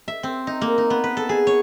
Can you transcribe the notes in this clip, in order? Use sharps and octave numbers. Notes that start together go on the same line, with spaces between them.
E5
C4
D#4
A#3
D#4
B3
B4
A4
G#4
C#5